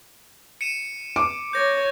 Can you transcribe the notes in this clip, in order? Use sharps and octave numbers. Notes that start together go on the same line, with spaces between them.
C#7 D#7 E7
D6
C#5 G6 A#6